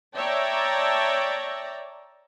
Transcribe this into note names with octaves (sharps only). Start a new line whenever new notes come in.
C#5 D5 E5 G5 A5 A#5